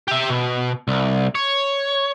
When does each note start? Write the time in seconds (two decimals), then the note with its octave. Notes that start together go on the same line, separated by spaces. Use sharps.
0.08 G4 E5
0.30 B2
0.88 C2
1.35 C#5